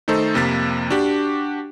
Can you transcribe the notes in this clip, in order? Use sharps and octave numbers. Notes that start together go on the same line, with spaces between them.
D#3 A3 D#4 A4 C5
F2 C3 A#3 A6 B6
D4 F#4 G4